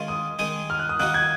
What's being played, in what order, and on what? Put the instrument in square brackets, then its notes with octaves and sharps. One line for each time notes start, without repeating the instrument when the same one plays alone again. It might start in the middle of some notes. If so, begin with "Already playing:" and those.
Already playing: [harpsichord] D#3 G#3 C#4 F4
[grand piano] D#6
[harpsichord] D#3 G#3 D#4 G#4
[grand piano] F6
F#6
D#6
[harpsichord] D#3 A#3 D#4 F#4 [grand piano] F#6
[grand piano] G#6